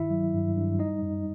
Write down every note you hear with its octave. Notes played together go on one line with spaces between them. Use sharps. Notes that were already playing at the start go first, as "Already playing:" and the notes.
Already playing: G2 D#3 E4 E5
F#3
G2
G2
G3 D#4 D#5
F#2